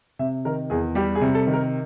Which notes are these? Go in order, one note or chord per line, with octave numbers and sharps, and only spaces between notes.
C3 E5
D#3 A#4
E2 G#4
G3 G4
G#4
C3
A4
D#3
A#4